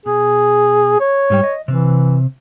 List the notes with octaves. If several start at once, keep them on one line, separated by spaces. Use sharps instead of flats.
B2 G#4
C#5
G#2 G3 G5
D#5
C3 E3 C4